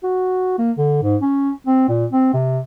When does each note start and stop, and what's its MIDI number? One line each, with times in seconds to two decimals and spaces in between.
0.03 0.53 66
0.58 0.71 58
0.78 0.98 50
1.03 1.16 44
1.22 1.51 61
1.67 1.86 60
1.88 2.05 46
2.12 2.31 60
2.33 2.59 48